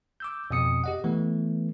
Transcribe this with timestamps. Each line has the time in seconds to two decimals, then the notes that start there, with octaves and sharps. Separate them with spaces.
0.20 D6 E6 G6
0.51 F2 B2 D#6 C#7
0.84 G4 D#5 F#5
1.04 E3 A3 B3